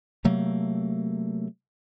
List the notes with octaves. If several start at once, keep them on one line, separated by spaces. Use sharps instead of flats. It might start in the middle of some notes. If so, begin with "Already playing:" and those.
C3 F#3 A3 A#3